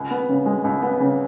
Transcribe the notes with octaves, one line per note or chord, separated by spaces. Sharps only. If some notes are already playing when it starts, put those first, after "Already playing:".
Already playing: C#2
B3
C#3
G#3
C#2
B3
C#3